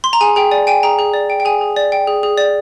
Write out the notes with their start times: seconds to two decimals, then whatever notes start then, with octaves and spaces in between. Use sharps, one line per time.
0.04 C6
0.13 A#5
0.21 G#4 G#5
0.36 G#4 G5
0.51 D5 G#5
0.67 G5 G#5
0.83 G#4 G5 A#5
0.99 G#4
1.14 D5
1.30 G5
1.40 G5
1.45 G#4 G#5
1.61 G#4
1.76 D5
1.92 G5
2.07 G#4
2.23 G#4
2.38 D5